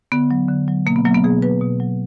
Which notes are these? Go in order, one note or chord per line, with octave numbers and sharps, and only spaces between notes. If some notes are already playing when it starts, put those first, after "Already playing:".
D3 B3
F#3
D3
F#3
B2 A#3
B3
F#3 A#3
B3
B2 G#4
F#3 B4
B2
F#3